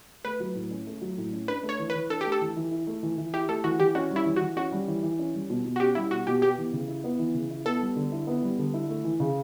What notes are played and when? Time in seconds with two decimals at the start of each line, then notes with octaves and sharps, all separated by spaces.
0.24 A3 B4
0.40 F#3
0.55 A2
0.71 C#4
0.87 A3
1.01 F#3
1.18 A2
1.33 C#4
1.48 D4 B4
1.63 A3
1.69 C#5
1.79 E3
1.90 B4
1.95 E3
2.10 D4 A4
2.21 A3 G4
2.32 A4
2.41 E3
2.56 E3
2.72 E4
2.87 A3
3.03 E3
3.18 E3
3.33 E4 G4
3.49 A3 A4
3.64 E3 F#4
3.80 E3 G4
3.95 C#4 F#4
4.11 G3
4.16 E4
4.26 E3
4.36 E3 F#4
4.57 C#4 F#4
4.72 G3
4.88 E3
5.03 E3
5.19 C#4
5.34 G3
5.50 B2
5.65 B2
5.76 F#4
5.80 C#4 G4
5.95 G3 E4
6.11 B2 F#4
6.27 B2 G4
6.41 B3 G4
6.58 E3
6.73 C#3
6.88 E4
7.04 B3
7.19 E3
7.34 C#3
7.50 E4
7.65 B3 A4
7.80 G3
7.96 D3
8.12 E4
8.27 B3
8.42 G3
8.58 D3
8.74 E4
8.89 A3
9.04 E3
9.20 C#3